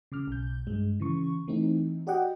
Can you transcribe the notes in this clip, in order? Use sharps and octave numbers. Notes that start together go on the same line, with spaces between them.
C#3 D6 F6
B1 G6
G2 G#3
C#3 E3 C#6
E3 A3 C4 D#4
F#4 G4 D5 D#5 F#5 G5